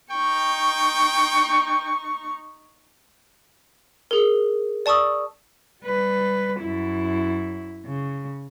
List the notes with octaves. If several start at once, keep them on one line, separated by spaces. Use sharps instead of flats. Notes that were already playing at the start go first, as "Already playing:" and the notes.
D#4 G5 C#6
G#4 A#4
D5 A5 C#6 D#6 E6
G3 B4
F#2 E4
C#3